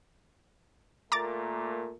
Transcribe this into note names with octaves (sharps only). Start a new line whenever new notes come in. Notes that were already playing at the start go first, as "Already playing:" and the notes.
A#2 A3 A#3 A#5 D6 A6